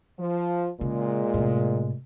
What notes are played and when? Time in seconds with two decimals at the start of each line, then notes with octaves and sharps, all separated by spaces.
0.19 F3
0.81 A#2 C#3 G#3
1.34 A2 C3